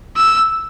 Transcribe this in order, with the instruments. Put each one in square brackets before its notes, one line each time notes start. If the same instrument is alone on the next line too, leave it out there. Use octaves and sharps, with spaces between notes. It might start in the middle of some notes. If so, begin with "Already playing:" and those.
[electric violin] E6